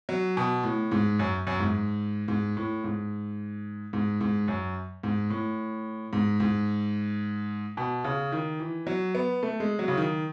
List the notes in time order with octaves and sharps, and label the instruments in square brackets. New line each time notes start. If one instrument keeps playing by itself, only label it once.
[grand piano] F#3
B2
A2
G#2
F#2
F#2
G#2
G#2
A2
G#2
G#2
G#2
F#2
G#2
A2
G#2
G#2
B2
C#3
D#3
E3
F#3
B3
A3
G#3
F#3
C#3
D#3